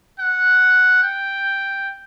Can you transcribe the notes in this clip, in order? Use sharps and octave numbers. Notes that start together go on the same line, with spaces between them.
F#5
G5